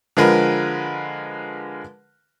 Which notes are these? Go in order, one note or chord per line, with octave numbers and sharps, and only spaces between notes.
D3 F3 G#3 A#4 B4